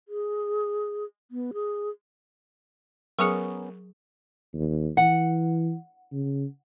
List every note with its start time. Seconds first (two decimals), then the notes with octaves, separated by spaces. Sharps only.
0.08 G#4
1.31 B3
1.54 G#4
3.19 F#3 B3 C#4 G#4 A#4 C#6 D#6 C#7
4.54 D#2
4.97 E3 F#5
6.12 C#3